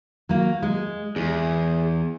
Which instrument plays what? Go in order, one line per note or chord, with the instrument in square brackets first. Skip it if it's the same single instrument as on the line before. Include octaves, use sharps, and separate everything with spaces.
[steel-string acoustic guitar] F#3 A#3
G#3
[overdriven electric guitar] E2 [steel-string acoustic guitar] G#4